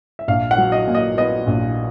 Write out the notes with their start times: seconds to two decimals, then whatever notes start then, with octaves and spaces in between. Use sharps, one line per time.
0.19 E5
0.28 A#1 F5
0.51 F#5
0.58 F#3
0.72 D#5
0.87 A#2
0.95 D#5
1.17 B3 D#5
1.47 A#1